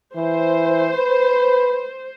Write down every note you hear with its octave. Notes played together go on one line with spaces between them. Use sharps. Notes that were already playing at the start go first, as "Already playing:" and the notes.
E3 C5
B4